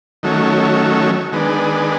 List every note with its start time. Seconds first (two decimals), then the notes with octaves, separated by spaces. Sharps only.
0.23 D#3 F#3 A3 C#4
1.32 D#3 G#3 B3 D4